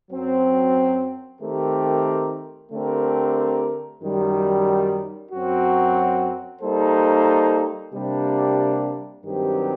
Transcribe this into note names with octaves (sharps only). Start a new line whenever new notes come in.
F#2 F#3 C4
D#3 A3 C4 G4 A#4
D3 A3 C4 G4 A#4
F#2 D#3 G3
F#2 F#3 C4 F#4
G3 A#3 D#4 A4 C5
C3 G3 A#3 D4
G2 D#3 F#3 C4 G4